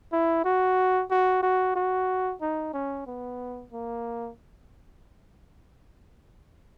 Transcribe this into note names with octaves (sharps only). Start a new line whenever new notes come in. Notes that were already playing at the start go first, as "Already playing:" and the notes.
E4
F#4
F#4
F#4
F#4
D#4
C#4
B3
A#3